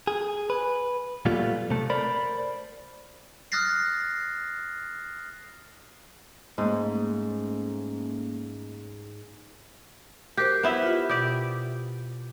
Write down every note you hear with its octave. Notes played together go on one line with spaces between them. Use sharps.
G#4
B4
A#2 F#3 G3 A3 B3 F4
C3 A3
A#4 C5 D5 B5
D#6 F6 F#6 A6 A#6 C7
G#2 A3 A#3 C#4
F#4 G4 A#4 C5
B3 E4 E5
F4 G4
B2 G4 D5